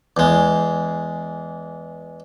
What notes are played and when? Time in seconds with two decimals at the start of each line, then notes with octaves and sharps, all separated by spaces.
0.17 E2 G#3